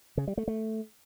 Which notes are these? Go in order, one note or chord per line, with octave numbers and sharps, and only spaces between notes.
C#3
G3
A3
A3